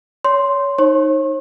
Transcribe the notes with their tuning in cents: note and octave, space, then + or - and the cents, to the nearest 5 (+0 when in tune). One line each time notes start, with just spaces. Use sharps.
C#5 +20 C6 +0
D#4 +0 C#5 -45 C#6 -45